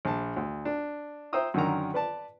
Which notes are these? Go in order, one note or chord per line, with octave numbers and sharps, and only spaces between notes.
A#1 A5
D2
D4
C5 E5 G5 A#5 D#6 E6
F#2 D3 D#3 A#5
B4 D5 A5